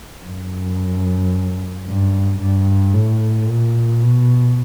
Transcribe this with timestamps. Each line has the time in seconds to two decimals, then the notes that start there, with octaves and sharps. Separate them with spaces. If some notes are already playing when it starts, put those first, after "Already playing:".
0.24 F#2
1.86 G2
2.40 G2
2.94 A2
3.48 A#2
4.02 B2